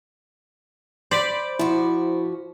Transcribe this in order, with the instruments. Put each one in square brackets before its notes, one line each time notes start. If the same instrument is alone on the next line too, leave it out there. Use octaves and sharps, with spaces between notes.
[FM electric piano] C5 B5 D6 [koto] D5
[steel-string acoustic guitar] F3 F#4 [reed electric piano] E4